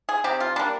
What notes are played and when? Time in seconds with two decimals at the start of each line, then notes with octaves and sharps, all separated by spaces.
0.09 G#4
0.24 C3 G4
0.40 F4
0.56 G3 A#3 D4